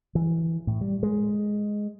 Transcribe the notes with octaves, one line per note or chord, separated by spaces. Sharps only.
E3
A2
G3
G#3